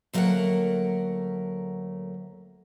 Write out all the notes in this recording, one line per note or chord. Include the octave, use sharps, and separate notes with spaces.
D2 F#3 A3 A#3 A#4 F#5